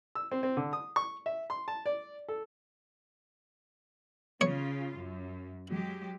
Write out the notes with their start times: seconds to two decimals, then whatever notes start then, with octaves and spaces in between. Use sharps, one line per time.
0.15 E6
0.31 C4
0.43 C4
0.57 D3
0.73 D#6
0.96 C#6
1.26 E5
1.50 C6
1.68 A5
1.86 D5
2.29 A4
4.41 C#3 F4 C#5
4.97 F#2
5.68 F#3 G#3 G4